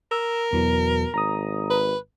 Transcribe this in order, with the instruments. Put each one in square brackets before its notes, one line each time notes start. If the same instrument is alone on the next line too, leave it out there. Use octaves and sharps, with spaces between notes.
[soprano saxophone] A#4 [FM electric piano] E6
[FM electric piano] E2 E3 F#3 [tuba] B2
[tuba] G#1 [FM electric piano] A#5 D#6
[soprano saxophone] B4